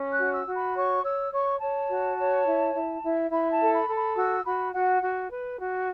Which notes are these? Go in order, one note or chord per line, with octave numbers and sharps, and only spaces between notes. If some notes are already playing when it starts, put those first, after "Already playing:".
Already playing: C#4
F#6
F#4
E6
F#4
B5
C#5 C#6
C#5 E6
C#5 C#6
C#5 A5
F#4
C#5
E4
E4
E4
E4 B5
A5
A4
B5
A4
B5
F#4 E6
F#4 B5
F#4 F#5
F#4
B4
F#4